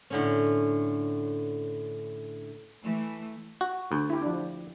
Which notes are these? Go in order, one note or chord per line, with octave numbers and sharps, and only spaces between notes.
A2 D3 C#4
E3 A3
F#4
D2
E4 G4
F3 D4